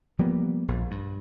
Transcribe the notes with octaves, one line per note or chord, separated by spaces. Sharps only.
F3 G3 A#3 B3
A#1
G2